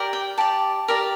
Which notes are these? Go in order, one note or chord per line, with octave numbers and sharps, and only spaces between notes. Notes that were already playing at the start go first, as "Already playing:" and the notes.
Already playing: G4 A#4 D5
G5
G4 D5 A5
G4 A#4 D5